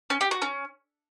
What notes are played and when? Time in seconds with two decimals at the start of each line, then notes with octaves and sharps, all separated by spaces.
0.10 C#4
0.21 G4
0.31 F#4
0.42 C#4